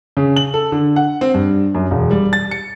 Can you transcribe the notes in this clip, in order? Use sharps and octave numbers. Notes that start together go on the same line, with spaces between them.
C#3
F#7
A4
D3
F#5
C4
G2
F#2
E1
G3
A6
C#7